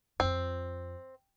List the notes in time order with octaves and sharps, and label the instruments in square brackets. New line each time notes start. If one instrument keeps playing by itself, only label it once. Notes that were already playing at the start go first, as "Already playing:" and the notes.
[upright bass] F2 F4 [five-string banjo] C4